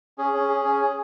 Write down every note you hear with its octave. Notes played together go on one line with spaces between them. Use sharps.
C#4 G#4
C#4
G#4
C#4
G#4